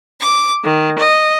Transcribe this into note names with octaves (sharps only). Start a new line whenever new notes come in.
D6
D#3
D#5